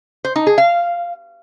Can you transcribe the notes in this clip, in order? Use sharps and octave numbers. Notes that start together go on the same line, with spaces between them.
C5
D#4
G#4
F5